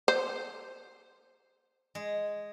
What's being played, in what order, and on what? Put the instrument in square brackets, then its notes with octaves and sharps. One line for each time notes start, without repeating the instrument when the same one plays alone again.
[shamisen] C5
[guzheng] G#3